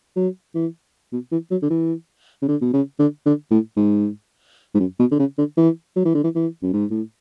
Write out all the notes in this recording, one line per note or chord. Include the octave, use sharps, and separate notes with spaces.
F#3
E3
B2
E3
F#3
D3
E3
C#3
D3
B2
C#3
D3
D3
A2
G#2
G#2
F#2
B2
D3
C#3
D3
E3
F#3
E3
D3
E3
E3
F#2
G#2
A2